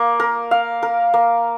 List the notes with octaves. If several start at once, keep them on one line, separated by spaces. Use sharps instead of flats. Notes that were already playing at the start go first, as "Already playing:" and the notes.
Already playing: A#3
A#4
F5
A#4
A#3